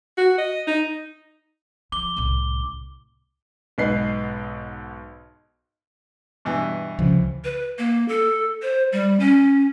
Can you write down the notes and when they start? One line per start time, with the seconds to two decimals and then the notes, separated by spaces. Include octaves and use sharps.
0.18 F#4
0.38 D#5
0.67 D#4
1.92 F3 D6 G7
2.17 C2 A2
3.78 B1 G#2 B3 D#4 B4 C7
6.45 G2 B2 E3
6.99 C#2 C#3 F3
7.44 B4
7.78 A#3
8.08 A4
8.62 C5
8.92 G3
9.20 C#4